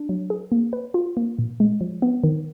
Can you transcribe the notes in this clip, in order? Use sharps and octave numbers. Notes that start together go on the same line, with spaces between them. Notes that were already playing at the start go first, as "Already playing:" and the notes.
Already playing: D4
F#3
G#4
A#3
B4
F4
A#3
A#2
G#3
F3
B3
D#3